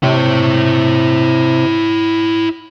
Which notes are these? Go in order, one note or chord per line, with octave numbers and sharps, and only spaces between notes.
C3 E4 C#5